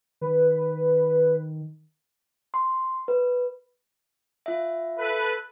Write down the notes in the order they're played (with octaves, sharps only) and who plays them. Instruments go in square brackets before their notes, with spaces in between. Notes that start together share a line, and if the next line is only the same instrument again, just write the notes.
[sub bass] D#3 [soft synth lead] B4
[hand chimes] C6
B4
F4 E5
[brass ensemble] A4 B4